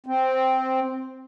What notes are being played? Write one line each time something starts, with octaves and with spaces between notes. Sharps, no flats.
C4